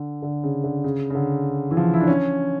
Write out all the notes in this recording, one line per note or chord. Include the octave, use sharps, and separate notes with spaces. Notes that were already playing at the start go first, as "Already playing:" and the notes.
Already playing: D3
D3
C#3
D3
C#3
C#3
D3
E3
F3
E4
D4
C#4